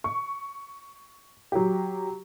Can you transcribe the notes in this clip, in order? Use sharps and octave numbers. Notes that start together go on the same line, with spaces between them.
C#6
F#3 G4